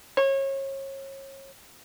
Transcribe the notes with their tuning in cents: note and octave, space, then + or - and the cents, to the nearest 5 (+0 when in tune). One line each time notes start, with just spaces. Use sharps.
C#5 -30